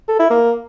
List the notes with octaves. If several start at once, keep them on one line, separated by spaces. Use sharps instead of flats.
A4
E4
A#3